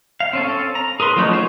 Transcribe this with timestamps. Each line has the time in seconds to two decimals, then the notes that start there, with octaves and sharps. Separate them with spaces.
0.20 F5
0.33 C4 C#4 A4
0.75 A#5
1.00 G#4 A#4 B4 C6
1.16 F3 F#3 A3 C#4 D#4
1.33 A#3 G#4 C5